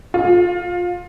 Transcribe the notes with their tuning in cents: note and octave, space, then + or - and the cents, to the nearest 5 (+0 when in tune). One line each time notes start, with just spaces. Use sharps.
F4 +20